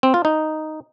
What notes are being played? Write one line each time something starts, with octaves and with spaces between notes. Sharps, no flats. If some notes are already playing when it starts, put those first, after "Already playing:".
C4
F4
D#4